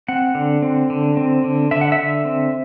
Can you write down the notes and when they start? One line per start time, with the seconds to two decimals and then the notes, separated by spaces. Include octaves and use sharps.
0.08 C4 F#5
0.35 D3
0.62 C4
0.90 D3
1.17 C4
1.44 D3
1.71 D3 E5
1.81 F#5
1.92 E5
1.99 D3
2.25 C4